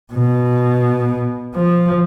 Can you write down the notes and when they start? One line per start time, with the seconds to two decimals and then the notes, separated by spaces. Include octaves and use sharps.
0.13 B2
1.55 F3